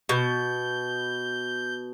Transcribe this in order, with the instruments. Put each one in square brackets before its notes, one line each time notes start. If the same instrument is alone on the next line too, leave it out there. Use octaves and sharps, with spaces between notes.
[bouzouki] B2 [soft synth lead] G6